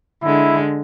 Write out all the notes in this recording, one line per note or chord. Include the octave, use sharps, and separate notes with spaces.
D3 G#3 E4